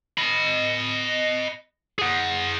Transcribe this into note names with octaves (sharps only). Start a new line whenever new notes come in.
D#5 B5
G#4 F#5